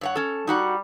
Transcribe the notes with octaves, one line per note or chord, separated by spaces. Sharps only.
G2 C#5 F#5
C#4 A4
G3 D#4 F#4 F#5